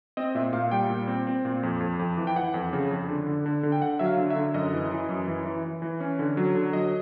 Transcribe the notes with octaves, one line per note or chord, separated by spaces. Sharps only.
C4 D#5
A#2 E5
A#2 F5
G3 G5
A#2
C4
C4
A#2
F2
F2
F2
E3
G5
E3 F#5
F2
C#3
F2
D3
D3
D3
D3
G5
D3 F#5
F#3 E5
F5
D3
E5
D3
F#2 D#5
E3
E3
F#2
E3
E3
E3
E3
C#4
D3
F#3
D3
F#3 D#5